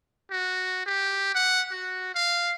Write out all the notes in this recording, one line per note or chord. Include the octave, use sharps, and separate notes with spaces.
F#4
G4
F#5
F#4
F5